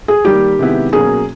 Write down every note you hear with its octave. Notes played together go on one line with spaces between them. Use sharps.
G#4
D#3 G3 A#3 G4
C3 D#3 G#3 B3 E4
B2 F#3 A#3 C#4 G#4